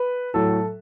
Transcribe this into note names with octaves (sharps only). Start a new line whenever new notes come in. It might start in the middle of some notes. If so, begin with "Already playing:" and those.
Already playing: B4
A2 F#3 A4